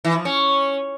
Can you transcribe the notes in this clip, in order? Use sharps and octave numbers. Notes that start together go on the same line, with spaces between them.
E3
F3
C#4